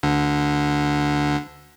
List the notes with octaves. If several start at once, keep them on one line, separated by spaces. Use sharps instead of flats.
D2 D3